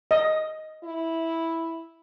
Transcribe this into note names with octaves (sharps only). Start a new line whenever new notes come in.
D#5
E4